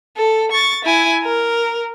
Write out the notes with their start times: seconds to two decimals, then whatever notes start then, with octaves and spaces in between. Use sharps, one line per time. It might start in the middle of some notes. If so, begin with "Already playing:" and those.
0.17 A4
0.52 C#6 A6
0.85 E4 G#5
1.23 A#4